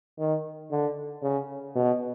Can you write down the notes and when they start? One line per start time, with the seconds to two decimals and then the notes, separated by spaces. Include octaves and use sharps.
0.19 D#3
0.71 D3
1.22 C#3
1.75 B2